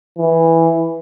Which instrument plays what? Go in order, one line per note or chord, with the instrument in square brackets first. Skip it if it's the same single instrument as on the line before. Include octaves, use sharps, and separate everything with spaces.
[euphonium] E3